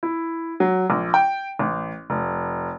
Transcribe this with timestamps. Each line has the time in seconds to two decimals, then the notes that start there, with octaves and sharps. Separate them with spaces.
0.03 E4
0.60 F#3
0.90 A#1
1.14 G5
1.59 A1
2.10 F1